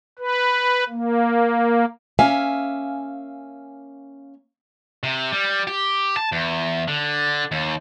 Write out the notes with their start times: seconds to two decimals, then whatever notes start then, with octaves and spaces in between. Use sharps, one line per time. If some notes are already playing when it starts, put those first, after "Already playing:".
0.19 B4
0.89 A#3
2.19 A#3 C#4 E5 F5 G#5
5.03 C3
5.32 G3
5.67 G4
6.17 A5
6.32 E2
6.88 D3
7.51 D#2